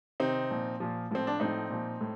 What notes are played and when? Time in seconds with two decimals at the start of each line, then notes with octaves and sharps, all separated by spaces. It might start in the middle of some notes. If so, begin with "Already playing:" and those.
0.20 C3 D#3 C4 D#4
0.50 A#2 F3
0.80 A#2 F3
1.11 A2 F3 C4
1.27 D4
1.40 A2 F3 C4 D#4
1.70 A#2 F3
2.01 A2